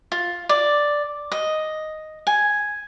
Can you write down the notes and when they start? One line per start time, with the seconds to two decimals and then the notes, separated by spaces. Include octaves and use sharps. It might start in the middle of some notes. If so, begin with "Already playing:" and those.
0.12 F4
0.49 D5
1.32 D#5
2.27 G#5